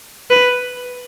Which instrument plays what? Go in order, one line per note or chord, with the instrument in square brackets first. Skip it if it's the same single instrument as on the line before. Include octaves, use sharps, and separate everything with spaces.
[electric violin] B4